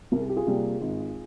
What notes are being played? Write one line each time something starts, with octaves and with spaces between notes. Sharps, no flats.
C2 A#4
G#4
G4
F4 G#4
C3 G3 A#3
G#1